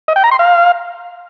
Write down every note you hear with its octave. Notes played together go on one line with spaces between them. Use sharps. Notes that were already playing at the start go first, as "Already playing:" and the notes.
D#5
G5
A#5
C6
F5